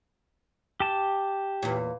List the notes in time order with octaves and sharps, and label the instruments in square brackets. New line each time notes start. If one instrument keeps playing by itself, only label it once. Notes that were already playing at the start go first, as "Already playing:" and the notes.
[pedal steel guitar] G4 A5
[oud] E2 A#2